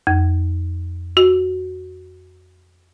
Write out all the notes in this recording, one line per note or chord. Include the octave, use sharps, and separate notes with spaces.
F2
F#4